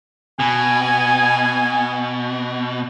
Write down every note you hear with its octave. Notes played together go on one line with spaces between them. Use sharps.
B2 G#5